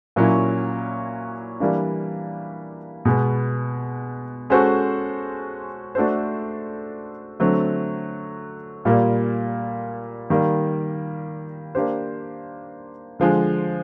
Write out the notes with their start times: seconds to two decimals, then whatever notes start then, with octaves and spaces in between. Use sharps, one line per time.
0.16 A#2 F#3 A#3 C#4 E4
1.60 E3 G3 A#3 D4
3.05 B2 G#3 B3
4.50 G#3 C#4 F#4 A4 C5
5.95 A3 D4 F#4 A4 C5
7.40 D3 F#3 A3 C4
8.85 A#2 G3 A#3
10.30 D#3 G3 A#3
11.75 A#3 D4 G4 C5
13.20 D3 F3 G#3